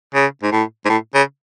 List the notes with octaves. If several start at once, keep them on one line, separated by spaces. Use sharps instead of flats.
C#3
G#2
A2
G#2
A2
C#3